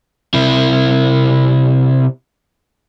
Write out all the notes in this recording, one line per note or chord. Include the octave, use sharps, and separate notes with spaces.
C3 E4